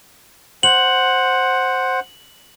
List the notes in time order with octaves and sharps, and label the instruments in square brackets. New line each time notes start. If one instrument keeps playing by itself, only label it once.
[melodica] C5 F#5 [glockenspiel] F#7